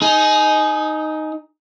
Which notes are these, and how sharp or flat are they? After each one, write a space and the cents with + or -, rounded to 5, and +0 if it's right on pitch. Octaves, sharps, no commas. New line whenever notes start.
D#4 +0 G#4 +25